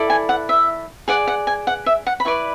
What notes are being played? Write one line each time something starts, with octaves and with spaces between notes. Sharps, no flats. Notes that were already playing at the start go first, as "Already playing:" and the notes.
Already playing: E4 A4 D5
G#5
F#5
E5
G#4 D5 F#5
F#5
G#5
F#5
E5
F#5
B5
E4 B4 D5 C#6